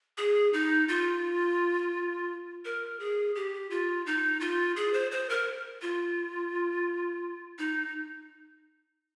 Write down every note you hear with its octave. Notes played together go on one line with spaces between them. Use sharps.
G#4
D#4
F4
A#4
G#4
G4
F4
D#4
F4
G#4
C5
C5
A#4
F4
D#4